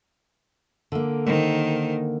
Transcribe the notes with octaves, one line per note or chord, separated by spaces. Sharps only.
D3 A#3
D#3 C5